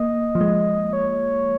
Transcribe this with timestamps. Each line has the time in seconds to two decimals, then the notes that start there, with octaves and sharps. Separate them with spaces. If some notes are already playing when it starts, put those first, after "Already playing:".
Already playing: A#3 D#5
0.35 F3
0.41 G#3
0.93 C#5